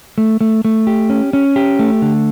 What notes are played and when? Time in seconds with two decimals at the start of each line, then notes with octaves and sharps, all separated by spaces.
0.18 A3
0.41 A3
0.65 A3
0.87 G4
1.10 C#4
1.33 C#4
1.56 G4
1.79 A3
2.02 D3